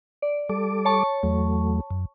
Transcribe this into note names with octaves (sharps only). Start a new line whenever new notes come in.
D5
G3 A4 D6
C#5 A5 C#6
E2 F#3 A3
F#2